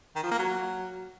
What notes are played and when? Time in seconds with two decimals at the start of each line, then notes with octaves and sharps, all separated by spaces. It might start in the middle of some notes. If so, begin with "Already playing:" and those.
0.16 D#3
0.23 F3
0.31 A#3
0.39 F#3